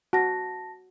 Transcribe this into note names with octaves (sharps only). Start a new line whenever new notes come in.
F#4 A5 A#6